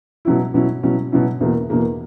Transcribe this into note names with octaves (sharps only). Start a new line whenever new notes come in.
B2 F#3 C#4 E4
B2 F#3 C#4 E4
B2 F#3 C#4 E4
B2 F#3 C#4 E4
E2 B2 A#3
E2 B2 A#3